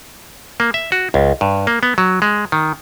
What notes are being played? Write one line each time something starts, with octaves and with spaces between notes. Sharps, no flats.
A#3
E5
F#4
C#2
G2
A#3
B3
F#3
G#3
D#3